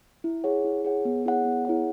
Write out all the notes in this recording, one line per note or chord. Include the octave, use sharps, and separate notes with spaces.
E4
G#4 C#5 F#5
E4
G#4 C#5 F#5
B3
E4 G#4 C#5 F#5
B3
E4 G#4 C#5 F#5